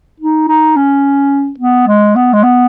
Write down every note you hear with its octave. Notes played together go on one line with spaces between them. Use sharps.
D#4
D#4
C#4
B3
G#3
B3
G#3
B3